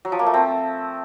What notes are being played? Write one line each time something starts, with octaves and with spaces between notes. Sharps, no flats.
F#3
F3
A#3
A3
C4